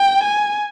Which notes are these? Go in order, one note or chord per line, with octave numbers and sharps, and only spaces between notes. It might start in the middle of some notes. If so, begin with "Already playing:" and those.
Already playing: G5
G#5